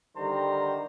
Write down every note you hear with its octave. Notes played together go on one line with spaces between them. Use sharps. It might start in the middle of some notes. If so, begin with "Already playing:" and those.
D3 D#3 G3 C5 A#5